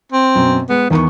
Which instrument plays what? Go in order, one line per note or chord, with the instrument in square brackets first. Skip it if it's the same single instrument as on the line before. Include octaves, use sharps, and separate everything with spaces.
[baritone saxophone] C4
[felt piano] F#2 B2
[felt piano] G#3 [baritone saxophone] B3
[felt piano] E2 B3 C#6 [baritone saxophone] D#3